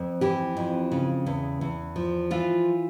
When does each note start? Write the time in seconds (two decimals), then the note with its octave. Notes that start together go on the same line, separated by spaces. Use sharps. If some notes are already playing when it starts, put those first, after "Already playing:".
Already playing: F2
0.21 E3 G4
0.57 F2
0.92 C#3
1.26 E2
1.61 E2
1.96 F3
2.31 E3 F4